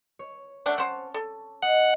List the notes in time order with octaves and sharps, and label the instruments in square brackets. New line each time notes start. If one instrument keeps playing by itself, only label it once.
[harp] C#5
[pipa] A3 D4 F#5 [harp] A5 C#6 D6
[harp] C#4 C#5 [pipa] C5 F#5
[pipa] A4
[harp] D#5 C7 [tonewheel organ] F#5